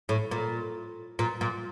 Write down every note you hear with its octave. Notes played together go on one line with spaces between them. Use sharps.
A2
A#2
A#2
A#2